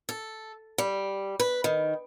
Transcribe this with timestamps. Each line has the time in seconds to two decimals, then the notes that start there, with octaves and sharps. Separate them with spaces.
0.09 A4
0.78 G3
1.40 B4
1.64 D#3